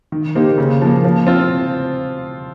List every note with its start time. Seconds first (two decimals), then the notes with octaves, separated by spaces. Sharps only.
0.12 D#3
0.35 A#3 D#4 G4 C5
0.58 C#3
0.82 F3 A#3
1.05 F3
1.27 C4 F4 C5